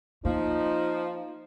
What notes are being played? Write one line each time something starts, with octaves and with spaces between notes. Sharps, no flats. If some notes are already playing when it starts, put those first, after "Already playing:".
F3 A#3 D#4